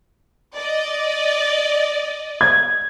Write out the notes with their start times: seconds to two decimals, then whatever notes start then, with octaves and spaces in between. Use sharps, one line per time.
0.57 D5 D#5
2.41 G#6